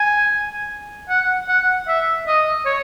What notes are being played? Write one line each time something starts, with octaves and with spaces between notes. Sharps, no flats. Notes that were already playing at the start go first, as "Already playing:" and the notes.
Already playing: G#5
F#5
F#5
E5
D#5
C#5